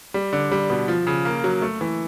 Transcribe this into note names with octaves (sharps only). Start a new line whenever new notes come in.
G3
D3
G3
B2
F3
C#3
A#3
F#3
A3
E3